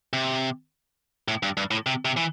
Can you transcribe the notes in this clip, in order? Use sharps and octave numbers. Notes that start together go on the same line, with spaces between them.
C3
A2
G2
G2
A2
C3
C3
E3